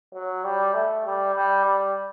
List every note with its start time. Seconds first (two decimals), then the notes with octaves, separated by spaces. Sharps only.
0.13 F#3
0.44 G3
0.74 A3
1.06 G3
1.35 G3
1.66 G3